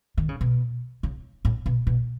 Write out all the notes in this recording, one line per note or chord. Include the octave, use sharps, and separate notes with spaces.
D#3
C#3
B2
C#3
A2
B2
B2